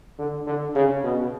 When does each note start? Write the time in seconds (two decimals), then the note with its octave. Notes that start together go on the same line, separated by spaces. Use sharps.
0.19 D3
0.47 D3
0.75 C#3
1.04 B2